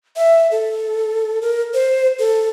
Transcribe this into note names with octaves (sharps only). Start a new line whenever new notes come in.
E5
A4
A#4
C5
A4